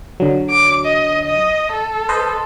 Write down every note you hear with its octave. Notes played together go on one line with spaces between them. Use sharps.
D3 F#3
D6
D#5
D#5
A4
B4 C5 D#5